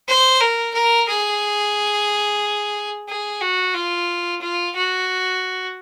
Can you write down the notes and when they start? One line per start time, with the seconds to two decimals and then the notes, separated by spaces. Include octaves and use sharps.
0.08 C5
0.41 A#4
0.74 A#4
1.08 G#4
3.08 G#4
3.41 F#4
3.74 F4
4.41 F4
4.75 F#4